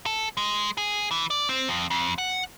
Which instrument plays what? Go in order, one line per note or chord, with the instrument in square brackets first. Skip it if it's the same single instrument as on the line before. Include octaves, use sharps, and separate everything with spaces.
[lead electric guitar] A4
G#3
G#4
E3
D5
C4
F2
F2
F#5